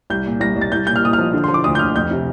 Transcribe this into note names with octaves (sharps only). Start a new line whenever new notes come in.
C2 G6
A#2
C2 A#6
C2
A6
C2 G6
A#2 G6
F6
A#2 D#6
F3 F6
D3
F3 C6
D6
D2 D#6
G6
D2 F6
F2 G6
C3